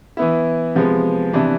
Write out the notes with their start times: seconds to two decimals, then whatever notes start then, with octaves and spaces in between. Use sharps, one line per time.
0.17 E3 B3 E4
0.75 C3 F3 G#3 B3
1.33 C3 E3 B3 D4